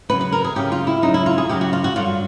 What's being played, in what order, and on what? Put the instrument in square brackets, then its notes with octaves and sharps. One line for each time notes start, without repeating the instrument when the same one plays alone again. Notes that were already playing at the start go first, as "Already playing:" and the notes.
[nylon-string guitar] F#2 C#3 F#3 B4
B4
A#4
G#4
F#2 C#3 F#3 G4
F4
E4
F#2 C#3 F#3 D#4
E4
F4
G#4
F#2 C#3 F#3 G4
F#4
F4
F#4
G2 D3 F#3 F4